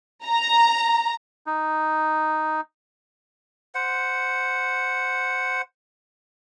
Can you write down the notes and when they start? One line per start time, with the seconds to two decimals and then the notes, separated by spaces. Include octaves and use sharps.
0.24 A#5
1.46 D#4
3.75 C5 F#5